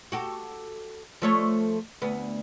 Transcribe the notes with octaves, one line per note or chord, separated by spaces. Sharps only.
F#4 G4 A4
F3 A3 C#5
D2 B3